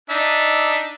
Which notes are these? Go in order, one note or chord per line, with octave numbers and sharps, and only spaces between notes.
D4 D#4 E5